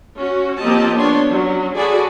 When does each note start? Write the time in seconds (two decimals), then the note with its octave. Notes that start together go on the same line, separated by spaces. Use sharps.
0.18 C#4 F#4
0.61 F3 A#3 C4 G4 D#5 A5
0.95 B3 D4 C#5 C6
1.29 F#3 C#4
1.75 F#4 G#4 A4 D5 G#5 B5